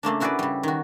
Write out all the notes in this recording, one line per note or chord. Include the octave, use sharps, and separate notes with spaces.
C#3 A3 A#3 D4
C#4 E4 F#4 G#4 B4 D5
C#3 G3
D#3 F#4